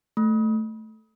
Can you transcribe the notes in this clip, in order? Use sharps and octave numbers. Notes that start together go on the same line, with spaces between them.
A3